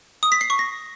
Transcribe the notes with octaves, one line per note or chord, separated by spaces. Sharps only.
D#6
B6
C7
C#6
A#6